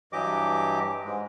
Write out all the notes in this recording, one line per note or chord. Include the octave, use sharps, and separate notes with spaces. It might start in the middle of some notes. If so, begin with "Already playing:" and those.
G2 E3 F#3 G4 D#5 D6
G#2 G#3